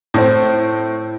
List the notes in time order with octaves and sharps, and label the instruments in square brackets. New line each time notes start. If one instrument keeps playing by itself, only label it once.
[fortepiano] A2 C4